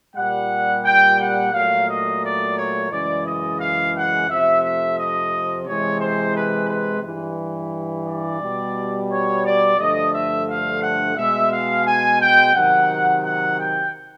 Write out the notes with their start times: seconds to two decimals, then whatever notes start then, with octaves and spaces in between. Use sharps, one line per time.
0.15 A#2 G3 F#5
0.84 G5
1.19 F#5
1.53 A#2 F#3 A3 F5
1.87 D#5
2.22 D5
2.56 C#5
2.90 F#2 C#3 E3 G#3 D5
3.25 D#5
3.59 F5
3.94 F#5
4.28 F2 C3 F3 A3 E5
4.63 E5
4.97 D#5
5.65 C3 E3 G#3 C#5
6.00 C5
6.34 B4
6.68 B4
7.03 G2 E3 G3
8.06 D5
8.41 B2 G3
9.10 C#5
9.45 D5
9.78 G2 D3 F3 A3 D#5
10.12 E5
10.47 F5
10.81 F#5
11.15 B2 G#3 E5
11.51 F5
11.84 G#5
12.19 G5
12.53 C3 D#3 F#3 F#5
13.22 F#5
13.57 G5